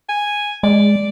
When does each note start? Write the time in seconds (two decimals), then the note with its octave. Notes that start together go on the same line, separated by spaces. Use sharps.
0.09 G#5
0.63 G#3 D5